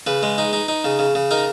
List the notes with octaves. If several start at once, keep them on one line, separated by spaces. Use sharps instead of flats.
C#3 B4
G#3
D#4
D#4
D#4
C#3
C#3
C#3
D#4 A#4